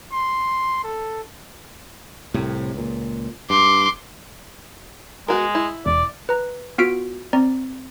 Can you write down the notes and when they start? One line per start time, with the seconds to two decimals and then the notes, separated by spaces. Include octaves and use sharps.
0.12 C6
0.84 A4
2.34 C2 A2 C3
2.74 C#2 A#2
3.50 G2 C6 D6
5.28 G#3 B3 F#4 A#4
5.55 E4
5.86 E1 D5
6.29 B4 A#5
6.78 B3 F4 F#4 F6 B6 D7
7.33 C4 D5 A#5